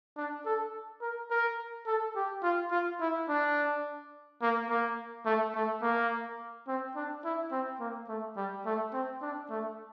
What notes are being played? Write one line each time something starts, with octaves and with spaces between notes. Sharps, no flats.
D4
A4
A#4
A#4
A4
G4
F4
F4
E4
D4
A#3
A#3
A3
A3
A#3
C4
D4
E4
C4
A#3
A3
G3
A3
C4
D4
A3